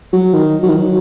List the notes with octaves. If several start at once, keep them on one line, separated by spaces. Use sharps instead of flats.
F#3
D#3
F#3
D#3
F#3